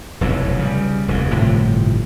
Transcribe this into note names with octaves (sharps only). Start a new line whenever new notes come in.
F1 B1 E2 G#2
C#3 G3
F1 D#2 G#2
G1 A2 C3 F3